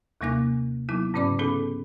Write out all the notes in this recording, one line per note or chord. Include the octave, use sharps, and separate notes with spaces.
D#2 C3 G3 A#3 D#4 F#6
F#3 B3 D#4 E4
G#2 C#3 C#4 D5 D6
B3 C#4 D#4 G#4 A4